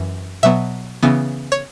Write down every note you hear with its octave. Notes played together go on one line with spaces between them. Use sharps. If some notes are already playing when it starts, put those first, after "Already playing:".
Already playing: F#2 E3
B2 F#3 B3 E5
C#3 E3 B3
C#5